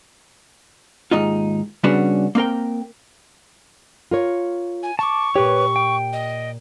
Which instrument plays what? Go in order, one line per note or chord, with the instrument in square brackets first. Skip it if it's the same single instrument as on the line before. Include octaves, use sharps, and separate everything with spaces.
[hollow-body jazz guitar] D#2 G#2 D#4 F4
C#3 G3 B3 C#4 D4 F#4
A#3 C4 A#4 G5
[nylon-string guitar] F4 A#4 C#5
[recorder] G#5
[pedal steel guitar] A5 D6 [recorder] C#6
[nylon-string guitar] A#2 G4 [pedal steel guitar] B4 C#5
[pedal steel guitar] G5
[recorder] D#5